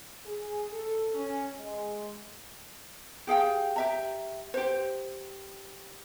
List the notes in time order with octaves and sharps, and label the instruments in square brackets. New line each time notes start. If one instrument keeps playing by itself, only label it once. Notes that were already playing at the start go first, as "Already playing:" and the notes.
[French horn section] G#4
A4
C#4
G#3
[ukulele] G4 G#4 F5 G5
G4 E5 A#5
G4 C5